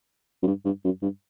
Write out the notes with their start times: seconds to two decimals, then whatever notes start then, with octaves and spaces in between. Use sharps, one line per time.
0.43 F#2
0.47 G2
0.65 G2
0.84 F#2
1.02 G2